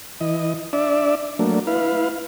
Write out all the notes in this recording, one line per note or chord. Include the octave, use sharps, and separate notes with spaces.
E3 D#5
D4 D5 E5
F#3 A3 A#3 D4
E4 B4 F5